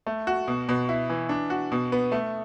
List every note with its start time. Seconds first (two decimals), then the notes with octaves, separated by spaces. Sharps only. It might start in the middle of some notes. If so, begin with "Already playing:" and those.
0.06 A3
0.27 F#4
0.48 B2
0.69 B2
0.89 E4
1.10 E3
1.29 D4
1.50 F#4
1.72 B2
1.92 B3
2.12 A3